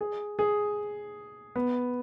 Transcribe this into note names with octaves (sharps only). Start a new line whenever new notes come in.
G#4
G#4
B3